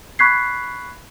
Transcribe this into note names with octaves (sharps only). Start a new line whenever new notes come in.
B5 C#6 F#6 G#6 B6 C7